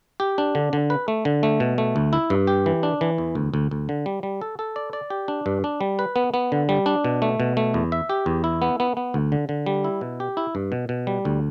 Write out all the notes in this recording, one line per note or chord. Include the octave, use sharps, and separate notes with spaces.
G4
D4
D3
D3
B4
A3
D3
A3
B2
A3
D2
E4
G2
G4
E3
D4
E3
E2
D2
D2
D2
D3
G3
G3
A4
A4
D5
D5
G4
D4
G2
D4
G3
B4
B3
B3
D3
G3
D4
B2
A3
B2
A3
E2
E5
G4
E2
E4
B3
B3
B3
D2
D3
D3
G3
E4
B2
G4
E4
G2
B2
B2
G3
D2